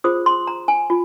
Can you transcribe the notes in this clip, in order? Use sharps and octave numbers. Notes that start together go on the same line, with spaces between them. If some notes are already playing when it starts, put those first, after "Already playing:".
F4 G#4 C5 D#6
C6
A#5
G#5
F4